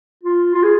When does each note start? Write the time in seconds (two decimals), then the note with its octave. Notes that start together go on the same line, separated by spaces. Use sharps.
0.23 F4
0.55 F4
0.63 G#4